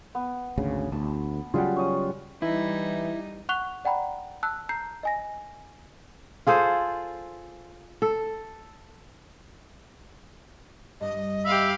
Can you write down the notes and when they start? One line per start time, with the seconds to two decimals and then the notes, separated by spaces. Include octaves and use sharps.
0.15 B3
0.57 G#1 D2 C#3
0.92 D2 A5
1.54 C#3 F#3 G3 F4 G#4 F#5
1.76 C#4 C#5 D#5
2.42 E3 G3 D#4 E4
3.49 F#5 C#6 F#6 F7 G7
3.85 D5 F#5 G5 A#5 B5
4.43 A5 E6 F#6
4.69 A#5 G6 C7
5.03 D#5 G#5 A#6
6.47 F4 G#4 A4 C5
8.02 A4
11.01 G2 D4 D#5
11.44 G4 E5 F5 B5